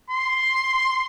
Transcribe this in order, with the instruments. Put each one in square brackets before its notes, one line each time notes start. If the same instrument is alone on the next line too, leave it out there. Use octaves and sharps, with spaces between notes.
[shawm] C6